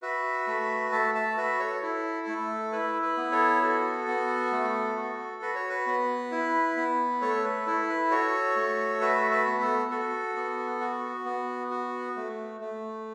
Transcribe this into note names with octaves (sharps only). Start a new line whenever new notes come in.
F#4 B4 E5
A3
A3 E5 A5
E5 A5
F#4 B4 E5
A4 C#5
E4 A4
A3
E4 B4
B4
B3
A4 C#5
F#4 A4
B3
A3
F#4
F#4 B4
C#5
B4
B3
E4
B3
A3 A4 C#5
B4
E4 A4
B4
F#4 A4 C#5
A3
F#4 B4 E5
B4 E5
B3
A4
F#4 A4
B3
F#4
B3
F#4
A3
A3